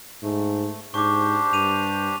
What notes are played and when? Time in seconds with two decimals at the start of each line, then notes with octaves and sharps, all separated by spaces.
0.23 G#2 A3
0.94 G#2 D4 G4 C5 C#6 D6
1.53 G2 D#7 F7